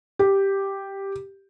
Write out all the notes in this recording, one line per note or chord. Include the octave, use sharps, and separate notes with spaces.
G4